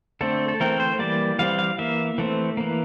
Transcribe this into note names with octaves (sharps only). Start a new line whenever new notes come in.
D3 A3 C4 A4
A4
E3 A3 C4 A#4
C5
E3 G3 A#3 D5
E3 G3 C4 F5
F5
E3 A#3 E5
E3 A3 C4
E3 A#3